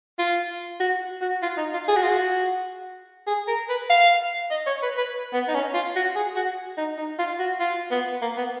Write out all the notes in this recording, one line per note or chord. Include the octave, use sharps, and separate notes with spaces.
F4
F#4
F#4
F4
D#4
F4
G#4
F#4
F4
F#4
G#4
A#4
B4
F5
D#5
C#5
B4
B4
B3
D#4
C#4
F4
F#4
G#4
F#4
D#4
D#4
F4
F#4
F4
B3
A#3
B3